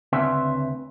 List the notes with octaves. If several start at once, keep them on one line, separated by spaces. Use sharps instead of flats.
D2 C#3 C4 C#4 B4 E5